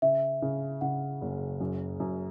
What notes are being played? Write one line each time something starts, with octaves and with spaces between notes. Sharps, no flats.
C#3 E5
C#3
C#3 F#5
F#1
F#2
F#2